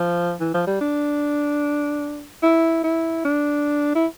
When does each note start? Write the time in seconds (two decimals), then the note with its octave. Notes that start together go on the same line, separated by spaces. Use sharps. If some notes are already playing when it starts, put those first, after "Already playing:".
Already playing: F3
0.40 E3
0.54 F3
0.67 G3
0.81 D4
2.43 E4
2.84 E4
3.25 D4
3.95 E4